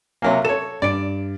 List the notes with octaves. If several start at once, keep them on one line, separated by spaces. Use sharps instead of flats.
C3 F#3 A#3 E5 F5 G#5
A4 C#5 E7
G2 D5 D7